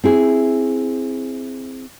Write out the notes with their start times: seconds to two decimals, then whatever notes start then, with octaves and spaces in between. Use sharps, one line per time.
0.04 C4 E4 G#4